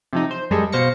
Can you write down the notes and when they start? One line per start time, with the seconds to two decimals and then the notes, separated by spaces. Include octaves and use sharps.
0.13 C3 F3 D#4
0.31 C5
0.50 F#2 G3 G#3 G#4 A4
0.72 B2 C5 F5 A#6 C#7